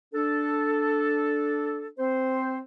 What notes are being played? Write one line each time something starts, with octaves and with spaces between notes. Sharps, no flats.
D4 A4
C4 C5